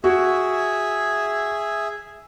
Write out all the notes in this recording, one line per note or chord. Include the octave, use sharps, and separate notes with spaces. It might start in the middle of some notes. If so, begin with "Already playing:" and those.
F#4 G#4 E5